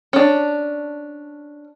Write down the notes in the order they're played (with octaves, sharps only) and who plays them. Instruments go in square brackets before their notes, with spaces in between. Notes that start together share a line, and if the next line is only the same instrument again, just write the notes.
[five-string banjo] C#4 D4